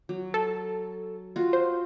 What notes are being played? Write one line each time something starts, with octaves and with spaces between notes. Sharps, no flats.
F#3
A4
F4 F#4
C5